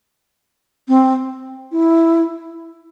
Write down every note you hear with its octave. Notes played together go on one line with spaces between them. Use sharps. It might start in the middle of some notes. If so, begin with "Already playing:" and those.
C4
E4